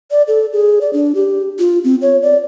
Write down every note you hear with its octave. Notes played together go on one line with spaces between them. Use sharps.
D5
A4
G#4
D5
D4
G4
F4
C4
C#5
D5